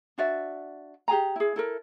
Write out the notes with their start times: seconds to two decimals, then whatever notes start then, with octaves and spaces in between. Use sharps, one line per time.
0.18 D4 F#4 D5 E5
1.08 G4 G#4 G#5 A#5
1.36 E4 G#4
1.56 E4 A4 A#4